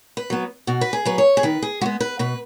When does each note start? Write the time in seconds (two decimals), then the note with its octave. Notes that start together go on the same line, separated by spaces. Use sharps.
0.17 B4
0.30 F#3 B3
0.67 B2 F#4
0.81 B4
0.93 G#4
1.05 F#3 B3 B4
1.18 C#5
1.37 G#4
1.43 D#3 B4
1.62 G#4
1.81 G#3 F#4
1.86 B3
2.00 B4
2.19 B2 B4